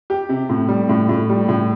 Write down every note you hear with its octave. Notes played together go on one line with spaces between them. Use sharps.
G4
C3
A2
G3
A2
A2
G3
A2